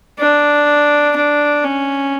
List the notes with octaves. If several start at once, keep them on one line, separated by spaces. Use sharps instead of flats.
D4
D4
C#4